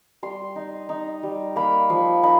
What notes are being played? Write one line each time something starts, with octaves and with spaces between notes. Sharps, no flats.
G3 C6
D#4
D#4
G3
A#3 B5
F3
D#4 B5